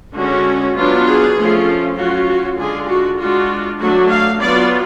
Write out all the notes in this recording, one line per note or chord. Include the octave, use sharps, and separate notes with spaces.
D3 G#3 C#4 F#4
F#3 B3 D4 F4
G#4
F3 A3 C#4 F4
F#3 C#4 F4 F#4
F#4
D3 G#3 D4 F4 G#4
F#4
G#3 D4 F4 F#4
F#3 A3 D4 F#4
F5
F#3 B3 F4 D5